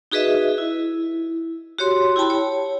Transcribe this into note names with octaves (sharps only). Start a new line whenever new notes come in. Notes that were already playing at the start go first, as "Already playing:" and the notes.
D#4 F#4 G#4 B4 D#5 E5
E4
F#4 G4 C#5 C6
E4 G4 G5 A5 B5
C#5